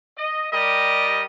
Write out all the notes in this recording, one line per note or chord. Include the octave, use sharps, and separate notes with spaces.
D#5
G3 G4 A#4 D5 D#5